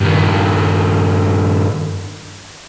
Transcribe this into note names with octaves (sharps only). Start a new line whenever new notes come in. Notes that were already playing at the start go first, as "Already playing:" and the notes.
G2 D#3